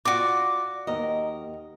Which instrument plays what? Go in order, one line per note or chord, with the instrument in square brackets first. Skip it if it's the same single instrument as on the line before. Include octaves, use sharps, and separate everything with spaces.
[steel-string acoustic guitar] F4 D5 [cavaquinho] F#4 D6
[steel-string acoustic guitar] D#2 A#4 D#5